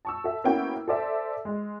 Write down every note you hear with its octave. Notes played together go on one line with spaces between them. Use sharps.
A5 C#6 E6
A4 E5
A#3 B3 C#4 E4 F#4 G5
A4 C5 D5 E5
G#3